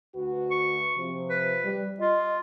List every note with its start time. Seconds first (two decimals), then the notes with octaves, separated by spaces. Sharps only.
0.16 D2 F#4 B4
0.51 C#6
0.97 C3 F3
1.29 B4
1.64 G3
2.00 F4 D#5